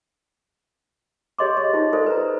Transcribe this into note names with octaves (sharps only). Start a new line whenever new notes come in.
G4 G#4 C#5 D#5 C6 D6
D#5
D#4 F4 C5
F4 A4 C5 D5
B4 C5 A#5